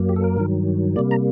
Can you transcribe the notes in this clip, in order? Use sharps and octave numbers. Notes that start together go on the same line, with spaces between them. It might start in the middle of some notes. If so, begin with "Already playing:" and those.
Already playing: F#2 F#3 A#3
G4
A4
A#4
G2 D#3 F#3
C3 G3 A#3 D5
A#5